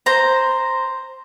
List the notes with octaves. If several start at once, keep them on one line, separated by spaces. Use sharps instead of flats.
C5 A#5